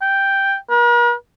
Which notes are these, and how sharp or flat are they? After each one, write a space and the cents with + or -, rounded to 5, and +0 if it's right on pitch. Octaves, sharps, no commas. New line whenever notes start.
G5 +0
A#4 +45